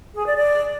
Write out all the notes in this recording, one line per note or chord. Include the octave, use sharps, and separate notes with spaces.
G#4
D5
D5